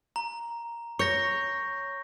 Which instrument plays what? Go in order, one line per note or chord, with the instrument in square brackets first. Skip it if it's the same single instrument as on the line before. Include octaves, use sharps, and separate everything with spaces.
[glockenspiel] A#5
[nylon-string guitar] C#5 [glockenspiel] C#6 G6 A#6